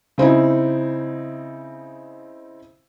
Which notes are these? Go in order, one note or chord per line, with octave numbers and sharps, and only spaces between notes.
C#3 C4 D#4 E4